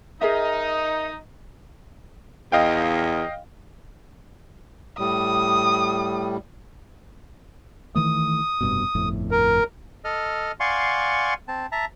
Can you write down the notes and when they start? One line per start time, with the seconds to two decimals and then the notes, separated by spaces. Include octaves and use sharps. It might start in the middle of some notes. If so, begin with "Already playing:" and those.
0.21 D#4 G#4 A#4 D#5 E5
2.52 E2 D#5 F5 G5
4.99 A2 G3 D#6
7.95 D#3 E3 A3 D#6
8.61 F1 G2 B2
8.95 G1 F2 A2
9.31 A#4
10.05 A4 D#5 F6
10.60 D5 F5 F#5 G#5 C6 C#6
11.48 C4 A5
11.72 E5 A5 A#5